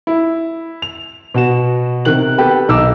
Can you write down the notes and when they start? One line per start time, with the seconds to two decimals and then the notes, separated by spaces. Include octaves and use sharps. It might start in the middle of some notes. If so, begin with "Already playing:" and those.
0.07 E4
0.82 F7
1.34 B2 F#4 E7
2.05 C3 D#3 F#6 F#7
2.38 B3 G4 A4 B4
2.69 B1 D#4 D6 E6